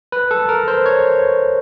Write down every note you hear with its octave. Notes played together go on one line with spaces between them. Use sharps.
B4
A4
A#4
C5
C#5